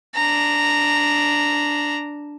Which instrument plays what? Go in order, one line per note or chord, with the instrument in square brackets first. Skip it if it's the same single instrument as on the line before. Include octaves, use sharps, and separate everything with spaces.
[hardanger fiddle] D4 A#5